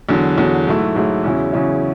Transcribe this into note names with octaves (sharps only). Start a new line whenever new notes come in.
E2 D3 F#3
E2 D3 F#3
G#2 F#3 A3 E4
G#2 F#3 A3 E4
E2 C#3 F#3 C#4 E4
E2 C#3 F#3 C#4 E4